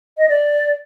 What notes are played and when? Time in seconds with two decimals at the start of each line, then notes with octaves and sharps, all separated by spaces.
0.18 D#5
0.29 D5